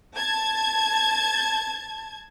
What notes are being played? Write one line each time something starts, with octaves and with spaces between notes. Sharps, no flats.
A5 G#6